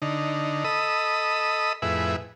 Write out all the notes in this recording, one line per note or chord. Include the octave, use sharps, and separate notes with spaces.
D3 D#4
A4 D#5 B5 D#6 E6
F2 A2 E4 G#4 B4 E5